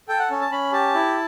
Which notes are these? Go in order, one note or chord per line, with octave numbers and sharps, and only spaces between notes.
A4 G5
F#5
C#4
A5
C#4 B5
G4 A5
E4